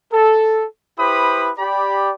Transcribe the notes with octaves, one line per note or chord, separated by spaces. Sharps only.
A4
E4 G4 B4 C5 B5 D#6
G4 D5 B5